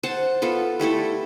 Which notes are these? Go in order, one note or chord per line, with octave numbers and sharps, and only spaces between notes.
C5 F#5 A5
B3 F4 A4
G3 A3 E4 A4